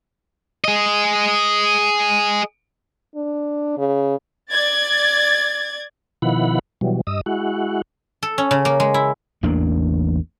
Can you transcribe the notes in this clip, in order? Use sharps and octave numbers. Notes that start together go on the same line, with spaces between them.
G#4 D#5
D4
C#3
D5 G#6 A6
B2 D#3 F3 E4 F#5 B5
B2 E3 F#3 G3
G2 D#5 D#6 E6
G#3 E4 F#4 F#5
A4
C#4
C#3
A#3
G#3
E4
A1 E2 A#3 D4